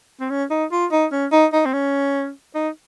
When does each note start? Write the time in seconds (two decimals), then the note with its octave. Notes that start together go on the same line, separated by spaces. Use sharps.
0.20 C4
0.30 C#4
0.50 D#4
0.72 F4
0.92 D#4
1.12 C#4
1.32 D#4
1.53 D#4
1.65 C4
1.73 C#4
2.55 D#4